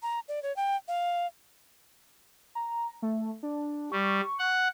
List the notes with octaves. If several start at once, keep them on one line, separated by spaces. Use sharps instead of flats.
A#5
D5
C#5
G5
F5
A#5
A3
D4
G3 C#6
F#5